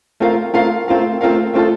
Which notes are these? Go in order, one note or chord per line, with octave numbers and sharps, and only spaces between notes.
A3 C4 F4 A#4 F5
A3 C4 F4 A#4 F5
A3 C4 F4 A#4 F5
A3 C4 F4 A#4 F5
A3 C4 F4 A4